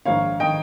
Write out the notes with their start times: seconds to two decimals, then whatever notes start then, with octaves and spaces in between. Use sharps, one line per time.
0.05 A#1 G#2 D#3 C#5 F5
0.40 D#3 D#5 G5